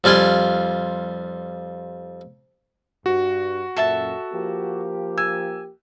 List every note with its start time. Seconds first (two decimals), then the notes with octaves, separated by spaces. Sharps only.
0.04 F2 G3 F4 G#5 C6
3.06 G2 F#4
3.77 F#2 A#2 A4 E5 A5
4.34 F3 A#3 G4
5.18 G#5 E6